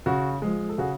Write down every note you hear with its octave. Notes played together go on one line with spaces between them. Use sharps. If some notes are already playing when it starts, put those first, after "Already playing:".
C#3 F#4
F3 G#3
A4
C#3 F#4 G#4